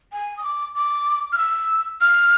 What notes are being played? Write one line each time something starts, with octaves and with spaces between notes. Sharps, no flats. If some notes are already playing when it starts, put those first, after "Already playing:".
G#5
D#6
D6
D6
F6
E6
F6